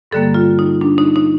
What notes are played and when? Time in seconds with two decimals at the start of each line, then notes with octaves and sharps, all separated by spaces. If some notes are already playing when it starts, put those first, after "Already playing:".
0.11 G2 D3 G3 A#3 A4
0.34 F4
0.59 D#4
0.81 D4
0.98 D#4
1.16 D#4